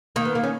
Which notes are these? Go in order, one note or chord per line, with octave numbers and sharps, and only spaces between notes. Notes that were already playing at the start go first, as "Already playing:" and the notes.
D#3 A#3
B3
A#3
C#4